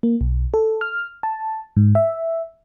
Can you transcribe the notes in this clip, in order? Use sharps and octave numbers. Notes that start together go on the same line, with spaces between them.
A#3
B1
A4
F6
A5
G#2
E5